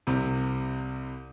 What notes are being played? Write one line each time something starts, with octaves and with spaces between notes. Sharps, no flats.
C2 C3